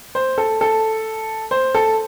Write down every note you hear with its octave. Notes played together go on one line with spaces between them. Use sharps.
C5
A4
A4
C5
A4